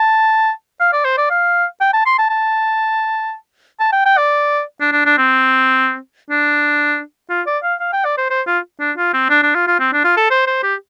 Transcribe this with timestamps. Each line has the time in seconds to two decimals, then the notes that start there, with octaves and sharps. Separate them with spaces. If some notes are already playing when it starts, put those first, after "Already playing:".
Already playing: A5
0.80 F5
0.93 D5
1.05 C5
1.18 D5
1.30 F5
1.81 G5
1.93 A5
2.06 C6
2.18 A5
2.30 A5
3.80 A5
3.92 G5
4.06 G5
4.17 D5
4.81 D4
4.92 D4
5.05 D4
5.18 C4
6.30 D4
7.30 F4
7.46 D5
7.63 F5
7.80 F5
7.93 G5
8.05 D5
8.18 C5
8.30 C5
8.47 F4
8.80 D4
8.97 F4
9.14 C4
9.30 D4
9.43 D4
9.55 F4
9.67 F4
9.80 C4
9.93 D4
10.04 F4
10.17 A4
10.30 C5
10.47 C5
10.63 G4